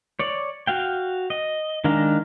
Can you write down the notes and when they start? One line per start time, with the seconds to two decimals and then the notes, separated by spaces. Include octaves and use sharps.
0.19 C#5 D5
0.67 F#4 F5 G5
1.30 D#5
1.84 D#3 G#3 D4 F5 A#5